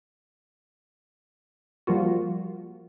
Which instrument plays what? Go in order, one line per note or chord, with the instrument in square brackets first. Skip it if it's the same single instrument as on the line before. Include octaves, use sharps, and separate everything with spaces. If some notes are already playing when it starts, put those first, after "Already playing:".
[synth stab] F3 G3 A#3 F4 F#4